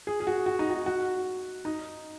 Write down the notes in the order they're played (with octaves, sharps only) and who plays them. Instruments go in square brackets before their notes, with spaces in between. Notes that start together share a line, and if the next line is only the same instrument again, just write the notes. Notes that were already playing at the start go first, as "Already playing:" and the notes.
[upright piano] G#4
G#4
F#4
F#4
D#4
F#4
F#4
D#4